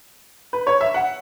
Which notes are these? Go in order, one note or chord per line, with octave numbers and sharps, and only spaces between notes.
B4
C#5
E5
F#5